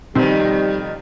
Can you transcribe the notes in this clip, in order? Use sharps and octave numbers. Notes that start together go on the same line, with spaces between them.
F2 B2 D#3 G3 C4 D#4